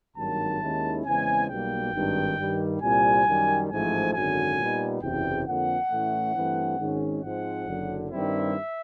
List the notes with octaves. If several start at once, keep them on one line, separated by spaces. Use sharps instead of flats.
G#1 G2 D#3 F#3 A#3 A5
D#2 D#3 G#3 C#4 E4
E2 C#3 E3 G#3 C4 G#5
B1 B2 G3 A#3 G5
G#1 G2 D#3
G2 D#3 G3
C2 A#2 G3 C4 G#5
F#2 D#3 G3
A1 G#2 F3 A3 G#5
G#1 F#2 D3 F#3 G#5
A#2 G3 B3 D#4
F#1 E2 C3 G5
F2 D3 F3 A#3 F#5
A2 E3 A3 C#4 E4
G2 E3 A3 C4
G#1 G#2 D#3 G#3 C#4
G#2 F3 G#3 C4 F#5
F#1 F#2 D3 F#3
G2 D#3 G3 C4 E4 E5